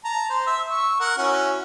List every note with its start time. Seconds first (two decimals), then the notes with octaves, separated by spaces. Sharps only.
0.05 A5 A#5
0.30 C5
0.47 E5
0.70 C#6 E6
1.00 A#4 F#5
1.18 C#4 E4 F#4